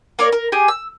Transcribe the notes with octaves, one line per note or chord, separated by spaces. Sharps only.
A#3 A#4 C#5 D5
A#4
G4 G#4 G#5
E6